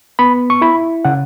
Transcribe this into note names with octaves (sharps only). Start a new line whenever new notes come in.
B3 B5
C#6
E4 B5
C#3 F#5